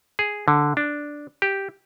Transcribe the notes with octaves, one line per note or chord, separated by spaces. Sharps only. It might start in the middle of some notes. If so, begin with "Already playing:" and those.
G#4
D3
D4
G4